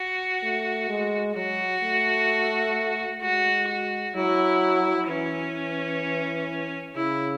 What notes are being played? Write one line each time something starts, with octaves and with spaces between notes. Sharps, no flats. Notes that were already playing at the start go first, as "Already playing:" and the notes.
Already playing: F#4
A3
G#3
F#3 F#4
A3
G#3 F#4
F#4
F#3 E4
E3 C#4
C#3 E4